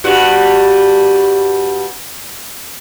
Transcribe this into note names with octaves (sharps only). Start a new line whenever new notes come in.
G2 G3 F#4